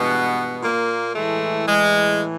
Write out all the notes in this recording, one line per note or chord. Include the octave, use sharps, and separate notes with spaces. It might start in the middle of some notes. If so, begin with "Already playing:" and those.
Already playing: G2 B2 E3 G#3 B3
A#2 A#3
A2 E3 G#3 A3
G#3